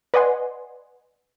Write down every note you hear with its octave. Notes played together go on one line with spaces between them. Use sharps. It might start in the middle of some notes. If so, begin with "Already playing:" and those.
B4 D5 D#5 F#5 G#5 C6